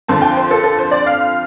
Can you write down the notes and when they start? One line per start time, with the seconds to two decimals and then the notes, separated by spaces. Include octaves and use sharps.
0.08 F2 D3 F3 A5
0.22 G5
0.37 C5
0.51 A4
0.63 A4
0.79 C5
0.91 D5
1.06 F5